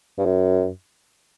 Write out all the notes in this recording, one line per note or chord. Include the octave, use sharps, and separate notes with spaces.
G2
F#2